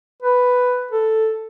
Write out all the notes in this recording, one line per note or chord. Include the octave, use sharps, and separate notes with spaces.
B4
A4